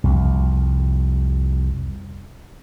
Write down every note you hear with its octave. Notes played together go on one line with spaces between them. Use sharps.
C2 F2